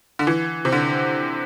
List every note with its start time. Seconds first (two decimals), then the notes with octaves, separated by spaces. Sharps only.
0.19 D3
0.27 E3
0.65 C3
0.72 D3